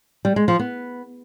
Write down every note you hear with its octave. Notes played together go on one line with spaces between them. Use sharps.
G3
G#3
F3
B3